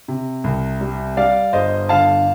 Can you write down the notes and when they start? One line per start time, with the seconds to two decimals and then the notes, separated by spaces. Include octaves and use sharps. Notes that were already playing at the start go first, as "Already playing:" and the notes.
0.08 C3
0.44 C2
0.81 G3
1.17 G3 D5 F5
1.53 G1 C5 D#5
1.89 D3 F5 A5